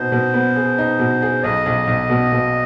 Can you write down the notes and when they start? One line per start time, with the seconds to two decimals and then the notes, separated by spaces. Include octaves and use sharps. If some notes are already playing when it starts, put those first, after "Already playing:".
Already playing: B2 D#4 C5
0.12 B2
0.34 B3
0.56 G#4
0.78 D#4
0.99 B2
1.22 G#4
1.44 B1 D#5
1.66 B1
1.87 B1
2.10 B2
2.32 B2